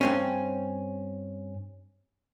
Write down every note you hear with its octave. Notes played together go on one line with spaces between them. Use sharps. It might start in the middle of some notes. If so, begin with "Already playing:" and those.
G2 C4 C#4